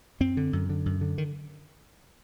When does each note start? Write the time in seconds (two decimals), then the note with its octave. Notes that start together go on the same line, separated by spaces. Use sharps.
0.20 F#2 C4
0.37 D3
0.53 F#2
0.70 D3
0.86 F#2
1.01 D3
1.18 D#3